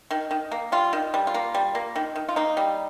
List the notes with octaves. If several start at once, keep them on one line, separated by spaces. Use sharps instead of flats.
D#3
D#3
A#3
G3 F4
D#3
G3
F4
A#3
G3
A#3
D#3
D#3
F4
A#3 D#4
G3